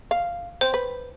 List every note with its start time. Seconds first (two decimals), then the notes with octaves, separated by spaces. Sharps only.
0.11 F5
0.61 C4 C5
0.74 B4